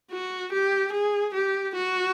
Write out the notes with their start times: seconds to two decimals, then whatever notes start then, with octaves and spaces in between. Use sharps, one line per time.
0.11 F#4
0.52 G4
0.93 G#4
1.34 G4
1.75 F#4